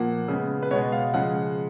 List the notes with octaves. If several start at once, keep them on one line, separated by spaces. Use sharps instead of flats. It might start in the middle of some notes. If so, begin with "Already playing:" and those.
Already playing: A#2 F3 A#3 F#5
C#3 G#3 B3
B4
B2 G#3 B3 C#5
F5
C#3 F3 G#3 F#5